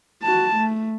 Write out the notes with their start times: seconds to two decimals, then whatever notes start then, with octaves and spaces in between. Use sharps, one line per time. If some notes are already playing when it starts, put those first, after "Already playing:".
0.23 F#4 A5
0.56 A3